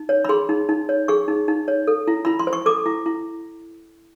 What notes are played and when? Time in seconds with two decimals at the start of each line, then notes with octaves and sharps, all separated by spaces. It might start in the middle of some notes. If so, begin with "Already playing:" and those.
Already playing: D#4
0.09 C#5
0.25 B5
0.29 G#4 C6
0.49 D#4
0.69 D#4
0.89 C#5
1.08 G#4 C#6
1.28 D#4
1.48 D#4
1.68 C#5
1.87 A4
2.08 E4
2.25 E4 B5
2.39 C6
2.47 C5
2.53 C#6
2.66 A4 D6
2.86 E4
3.06 E4